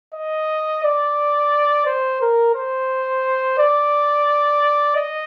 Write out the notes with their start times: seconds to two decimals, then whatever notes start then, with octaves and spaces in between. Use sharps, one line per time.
0.14 D#5
0.83 D5
1.86 C5
2.21 A#4
2.55 C5
3.58 D5
4.96 D#5